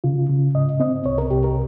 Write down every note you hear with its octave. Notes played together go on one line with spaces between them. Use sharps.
C#3 F4
C#3
G#2 D#5
C4 D#5
C2 C#5
A#4
C2 G4
A#4